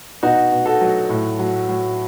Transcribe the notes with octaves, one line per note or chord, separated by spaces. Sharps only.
B2 D#4 F#4
B2
F#4 A4
F#3
A2
F#3
F#3